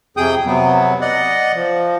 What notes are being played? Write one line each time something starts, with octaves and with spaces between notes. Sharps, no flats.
F2 C3 G#4 G5 D#6 G6
C3 F#3 B3
D5 D#5 F#5
F3